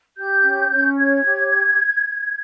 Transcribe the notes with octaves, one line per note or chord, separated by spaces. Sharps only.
G4 G6
C#4
C#4
C#5 G#6
G4